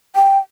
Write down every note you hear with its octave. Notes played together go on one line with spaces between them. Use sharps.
G5